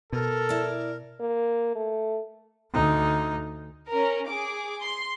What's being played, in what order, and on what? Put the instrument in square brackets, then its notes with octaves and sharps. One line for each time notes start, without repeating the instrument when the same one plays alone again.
[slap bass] B2 [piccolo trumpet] A4 [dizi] A#4
[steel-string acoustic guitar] E4 D5
[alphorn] A#3
A3
[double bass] D2 D#4
[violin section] C#4 A#4
G#4 D6
C6